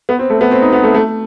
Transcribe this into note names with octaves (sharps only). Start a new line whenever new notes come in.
B3
C4
A3
B3
C4
D#4
B3
A3
A3